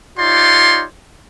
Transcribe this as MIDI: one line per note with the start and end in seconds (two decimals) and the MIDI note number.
0.18 0.84 63
0.18 0.84 65
0.18 0.84 67
0.18 0.84 73
0.18 0.84 74
0.18 0.84 84